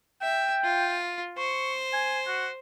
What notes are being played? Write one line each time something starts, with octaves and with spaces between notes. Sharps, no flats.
E5 G5
F4
C5 C#6
G#5
F#4